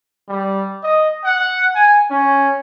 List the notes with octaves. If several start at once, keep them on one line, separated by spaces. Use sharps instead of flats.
G3
D#5
F#5
G#5
C#4